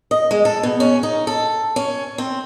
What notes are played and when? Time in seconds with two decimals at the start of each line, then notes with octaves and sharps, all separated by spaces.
0.11 D#5
0.31 G#3
0.45 A4
0.63 B2
0.80 C#4
1.03 D#4
1.27 A4
1.76 C#4
2.18 C4